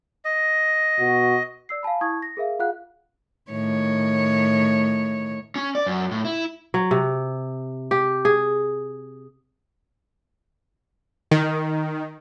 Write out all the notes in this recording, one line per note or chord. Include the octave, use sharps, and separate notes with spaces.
D#5
B2 F#4
D5 E6 C7
F5 G#5 A5 B5
E4 A5 C#6 D#6 G#6
A#6
G#4 A#4 E5 F5
F4 G#4 F5 F#5 F#6
A2 D#3 C#5
C#4
D5
F#2
A2
E4
F#3
C3
G4
G#4
D#3